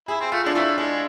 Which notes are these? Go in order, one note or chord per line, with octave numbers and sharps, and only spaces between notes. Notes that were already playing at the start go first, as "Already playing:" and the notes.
E4 G#4
C4
A3 F4
G#3 D4
C3 E3 A3 E4
G#3 D4